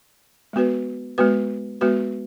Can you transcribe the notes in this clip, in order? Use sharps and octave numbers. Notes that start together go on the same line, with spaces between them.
G#3 B3 F#4 B4
G#3 B3 F#4 B4
G#3 B3 F#4 B4